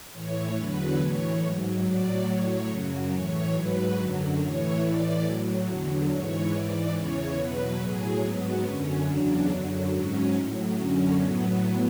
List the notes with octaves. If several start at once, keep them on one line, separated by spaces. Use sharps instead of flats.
A2 E3 C#5
E2 D3 F#3 B4
A2 E3 C#5
G#2 F#3
A2 F#3 D5
A2 F#3 C#5
F#2 C#3 F#3
A2 E3 C#5
G#2 F#3 B4
F#2 D3 F#3
A2 E3 C#5
A2 E3 D5
A2 F#3
E2 D3 F#3
G#2 E3 C#5
G#2 E3 D5
E2 C#3 E3 C#5
E2 B2 F#3 B4
A2 F#3 G#4
G#2 F#3 B3
F#2 D3 F#3 C#4
E2 C#3 F#3 D4
F#2 D3 F#3
G#2 F#3 C#4
A2 F#3
F#2 D3 F#3 C#4
A2 F#3 B3